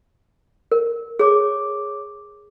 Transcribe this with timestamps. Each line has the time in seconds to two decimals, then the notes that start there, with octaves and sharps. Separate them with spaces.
0.71 A#4
1.19 G#4 C#5 D6